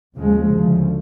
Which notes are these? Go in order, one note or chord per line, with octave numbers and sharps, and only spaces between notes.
D#2 C#3 F3 G#3
D2 C#3 F3